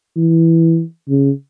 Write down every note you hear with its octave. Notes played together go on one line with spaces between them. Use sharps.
E3
C#3